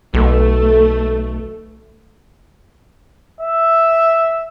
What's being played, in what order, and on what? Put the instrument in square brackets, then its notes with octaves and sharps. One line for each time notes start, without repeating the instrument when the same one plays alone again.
[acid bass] B1 [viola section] A3
[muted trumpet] E5